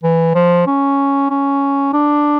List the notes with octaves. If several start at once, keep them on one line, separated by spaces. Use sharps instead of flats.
E3
F3
C#4
C#4
D4